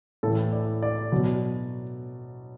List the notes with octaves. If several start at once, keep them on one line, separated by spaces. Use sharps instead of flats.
A2 E3 A4
D5
D5
B2 F#3